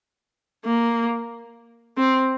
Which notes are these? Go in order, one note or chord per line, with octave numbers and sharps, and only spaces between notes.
A#3
C4